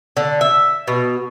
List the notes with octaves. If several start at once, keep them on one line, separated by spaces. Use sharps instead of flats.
D3
E5
B2